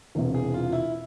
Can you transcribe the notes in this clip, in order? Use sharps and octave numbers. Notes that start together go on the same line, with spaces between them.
E1 E2 C3
G#4
F4
E4